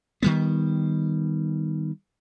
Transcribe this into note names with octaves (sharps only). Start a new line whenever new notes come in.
D#3 G3 B3